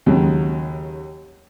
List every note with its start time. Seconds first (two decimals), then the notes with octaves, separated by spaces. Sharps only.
0.06 D#2 C#3 F#3